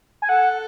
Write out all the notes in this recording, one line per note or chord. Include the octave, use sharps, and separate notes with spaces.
G#5
A4 F#5